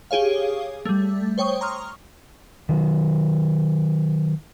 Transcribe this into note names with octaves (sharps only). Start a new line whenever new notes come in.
G4 G#4 C#5 F5
G3 A3
C5 C#5 G5 C#6 D#6
A#5 C6 C#6 D#6 F6
D#3 F#3